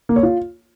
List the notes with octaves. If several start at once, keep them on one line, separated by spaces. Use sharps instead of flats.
A#3
C#5
F4